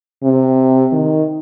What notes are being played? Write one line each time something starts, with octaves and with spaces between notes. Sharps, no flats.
C3
D#3